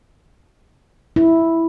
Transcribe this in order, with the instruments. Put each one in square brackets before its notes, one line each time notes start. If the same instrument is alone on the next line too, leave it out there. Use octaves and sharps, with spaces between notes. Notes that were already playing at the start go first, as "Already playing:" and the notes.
[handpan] E4